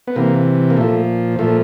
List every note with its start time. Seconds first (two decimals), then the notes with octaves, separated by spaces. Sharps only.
0.07 B3
0.16 C3 E3 A#3
0.70 A#3
0.77 A#2 F3 A3
1.39 A#2 F3 A3